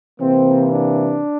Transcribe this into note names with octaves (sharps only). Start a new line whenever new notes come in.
C3 E3 A#3 C4
D4